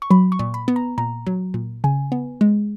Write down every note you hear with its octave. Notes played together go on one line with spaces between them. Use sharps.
C#6
F#3 B5
C#6
A#2
B5
B3
A#5
A#2 A#5
F#3
A#2
C#3 G#5
B3
G#3